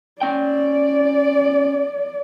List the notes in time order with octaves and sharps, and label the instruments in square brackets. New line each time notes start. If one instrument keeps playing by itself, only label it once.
[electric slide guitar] C#4 G5 [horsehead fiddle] D5